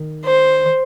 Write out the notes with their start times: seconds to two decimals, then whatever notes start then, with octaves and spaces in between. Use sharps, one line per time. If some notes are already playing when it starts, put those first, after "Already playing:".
Already playing: D#3
0.25 C5